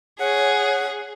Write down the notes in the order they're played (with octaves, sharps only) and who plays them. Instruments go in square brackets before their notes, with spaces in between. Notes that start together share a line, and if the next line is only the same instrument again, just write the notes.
[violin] G#4 [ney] C#5 [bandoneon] F#5